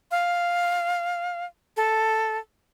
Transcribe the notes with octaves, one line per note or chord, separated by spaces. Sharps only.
F5
A4